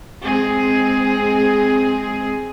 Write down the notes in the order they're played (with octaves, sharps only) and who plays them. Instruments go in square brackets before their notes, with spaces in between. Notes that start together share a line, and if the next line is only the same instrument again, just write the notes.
[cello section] G#3 C4 G#4